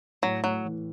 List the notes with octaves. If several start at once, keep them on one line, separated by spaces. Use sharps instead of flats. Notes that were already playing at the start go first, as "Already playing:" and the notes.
A2 F#3
A2 F#3
E3